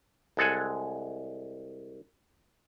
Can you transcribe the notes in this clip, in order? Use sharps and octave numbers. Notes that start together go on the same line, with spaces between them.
C2 G#3 A4 F#5 G#5